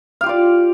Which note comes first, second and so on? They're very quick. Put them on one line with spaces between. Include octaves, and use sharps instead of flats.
F5 G4 F4 D5